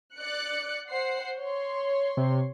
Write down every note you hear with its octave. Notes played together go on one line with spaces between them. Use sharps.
D5 F#6 C#7
C5 F#5 C7
C#5 C6
C3